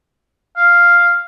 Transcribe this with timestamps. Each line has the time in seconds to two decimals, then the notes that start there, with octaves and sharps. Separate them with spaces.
0.57 F5